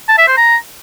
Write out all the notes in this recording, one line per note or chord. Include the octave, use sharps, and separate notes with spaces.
A5
E5
C5
A#5